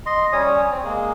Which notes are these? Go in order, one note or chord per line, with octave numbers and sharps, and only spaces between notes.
D#5 C6
G3 C#4 C#5 D#6
C4
G#3 A#3 G#4